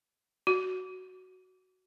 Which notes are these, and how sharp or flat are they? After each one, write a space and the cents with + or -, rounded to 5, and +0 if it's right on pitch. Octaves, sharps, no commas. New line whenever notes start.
F#4 +5